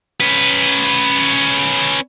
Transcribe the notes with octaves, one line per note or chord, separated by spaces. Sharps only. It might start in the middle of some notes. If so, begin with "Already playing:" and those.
C#4 B4